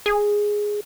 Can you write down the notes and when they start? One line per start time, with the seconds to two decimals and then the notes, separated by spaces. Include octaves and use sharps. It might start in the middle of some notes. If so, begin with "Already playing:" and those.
0.06 G#4